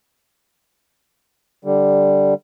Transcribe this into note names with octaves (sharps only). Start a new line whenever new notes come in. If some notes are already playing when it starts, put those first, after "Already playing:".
D3 G3